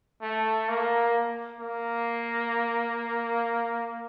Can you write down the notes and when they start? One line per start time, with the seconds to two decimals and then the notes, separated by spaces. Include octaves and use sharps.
0.22 A3
0.68 A#3
1.61 A#3